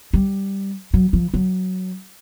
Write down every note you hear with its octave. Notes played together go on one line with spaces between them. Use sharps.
G3
F#3
F3
F#3